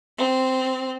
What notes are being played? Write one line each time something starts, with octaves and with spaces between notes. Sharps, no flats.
C4